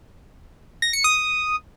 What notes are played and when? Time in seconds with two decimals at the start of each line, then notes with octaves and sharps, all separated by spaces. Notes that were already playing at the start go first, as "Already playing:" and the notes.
0.82 A#6
0.93 C#7
1.04 D#6